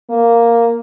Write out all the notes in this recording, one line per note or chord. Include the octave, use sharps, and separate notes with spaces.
A#3